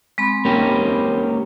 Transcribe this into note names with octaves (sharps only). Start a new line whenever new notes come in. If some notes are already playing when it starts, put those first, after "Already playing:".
G#3 C4 B5
A#3 C#4 G4